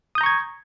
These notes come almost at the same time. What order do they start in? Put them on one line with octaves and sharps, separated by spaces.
D#6 G6 A#5 C#6 G#6